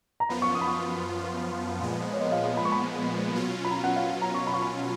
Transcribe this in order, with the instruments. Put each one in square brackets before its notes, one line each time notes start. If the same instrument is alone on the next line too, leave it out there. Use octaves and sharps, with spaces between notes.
[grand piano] A#5
[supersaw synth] F#2 F3 B3 F4 [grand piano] B5
[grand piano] C#6
D#6
B5
C#6
[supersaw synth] A#2 F3 G#3 B3
[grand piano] C#5
D#5
F5
F5
B5
C#6
B5
[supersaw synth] B2 F#3 C#4 F4
[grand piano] B5
A#5
F#5
F5
F#5
A#5
C#6
B5
C#6
B5